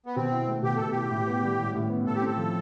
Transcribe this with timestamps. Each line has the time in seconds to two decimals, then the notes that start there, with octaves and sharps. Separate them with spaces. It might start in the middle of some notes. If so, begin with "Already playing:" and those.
0.06 B3
0.16 B2 C4
0.32 E4
0.47 A3
0.63 B2 G4
0.77 B2 A4
0.91 E4 G4
1.10 A2
1.27 B3
1.43 G3
1.59 A2
1.75 A2
1.90 B3
2.06 A2 A4
2.15 G4
2.22 C4 A4
2.37 F3